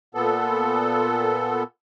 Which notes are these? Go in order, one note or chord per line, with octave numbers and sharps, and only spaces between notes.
A#2 B3 A4